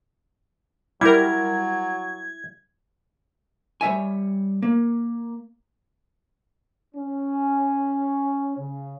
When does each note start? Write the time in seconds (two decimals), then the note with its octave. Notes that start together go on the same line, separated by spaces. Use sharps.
1.01 F#3 G3 E4 A#4 G#6
3.81 G3 C#5 E5 G#5
4.62 A#3
6.95 C#4
8.57 C#3